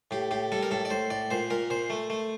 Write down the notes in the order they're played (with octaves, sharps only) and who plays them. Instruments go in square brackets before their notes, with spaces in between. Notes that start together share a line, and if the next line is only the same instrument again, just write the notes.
[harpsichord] A2 G4
A2 G4
G3 A4
A#4
A2 A4
D5
A2 C5
A2 D5
A#2 C5
A#2 A#4
A#2 C5
A3
A3